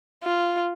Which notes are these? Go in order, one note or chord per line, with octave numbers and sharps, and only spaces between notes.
F4